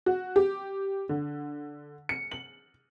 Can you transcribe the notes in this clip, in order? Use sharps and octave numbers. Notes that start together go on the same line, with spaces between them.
F#4
G4
D3
C#7
F#7